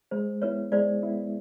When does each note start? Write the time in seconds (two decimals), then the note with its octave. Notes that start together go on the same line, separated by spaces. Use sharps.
0.11 G#3 C5
0.42 B3 E4 B4 C#5
0.72 G#3 C5 D5
1.02 B3 E4